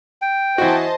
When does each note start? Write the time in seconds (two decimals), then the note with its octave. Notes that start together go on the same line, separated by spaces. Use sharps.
0.22 G5
0.58 E3 F#4 C5 D#5 A5